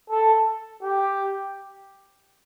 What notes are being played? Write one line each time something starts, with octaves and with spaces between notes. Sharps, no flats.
A4
G4